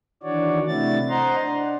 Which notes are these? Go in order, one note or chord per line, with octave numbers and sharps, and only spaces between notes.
D#3 E3 D4 F#4 C#5 D5
C3 A3 D4 E4 A6
C5 D#5 F#5 A#5 C6
D4